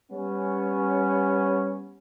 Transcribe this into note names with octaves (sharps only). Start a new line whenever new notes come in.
G3 B3 C#4